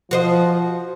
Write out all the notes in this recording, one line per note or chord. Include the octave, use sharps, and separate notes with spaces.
F3 F#4 C5 D#5